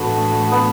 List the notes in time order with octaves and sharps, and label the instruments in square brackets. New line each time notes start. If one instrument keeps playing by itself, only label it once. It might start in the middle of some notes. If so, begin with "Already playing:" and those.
Already playing: [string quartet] A2 E3 A3 D4 F#4 [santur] B3
[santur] B3